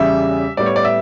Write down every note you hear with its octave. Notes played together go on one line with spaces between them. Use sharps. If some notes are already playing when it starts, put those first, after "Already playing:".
Already playing: E2 C#3 G3 C#4 E5
A2 G3 B3 D5
C#5
D5
E5